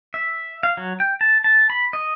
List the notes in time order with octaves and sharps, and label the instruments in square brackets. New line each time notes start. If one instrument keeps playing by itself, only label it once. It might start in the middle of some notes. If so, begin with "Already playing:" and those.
[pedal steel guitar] E5
F5
F#3
G5
A5
A5
B5
D#5